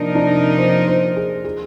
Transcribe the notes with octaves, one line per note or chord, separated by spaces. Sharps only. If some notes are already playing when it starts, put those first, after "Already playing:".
Already playing: C3 F3 A#3 D4 D#4 A#4
D4
C5
C5
G#4
G#4